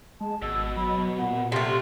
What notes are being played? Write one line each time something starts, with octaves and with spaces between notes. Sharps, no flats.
G#3 A5
G#1 B2 E6
F#3 B5
A#2 F#5
C3 A3 A4 F5 C6